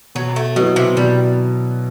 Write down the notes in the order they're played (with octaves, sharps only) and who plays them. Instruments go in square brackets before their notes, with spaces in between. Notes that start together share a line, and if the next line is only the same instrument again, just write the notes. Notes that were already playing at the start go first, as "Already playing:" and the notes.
[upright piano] B2 [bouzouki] F#3
[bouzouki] A3
[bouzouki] B2 [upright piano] F#3 B3 E4
[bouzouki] C3
[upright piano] B2 [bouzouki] G3